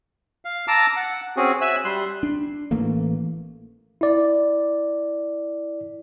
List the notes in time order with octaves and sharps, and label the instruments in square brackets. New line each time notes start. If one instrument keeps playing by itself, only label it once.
[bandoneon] F5
A5 A#5 D6 E6
F#5
C4 C#4 F#4 G#4
E5 G#5 E6 F#6
G3 C6 F#6
[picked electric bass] D4
A1 E3 A3 A#3
[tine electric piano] E4 D5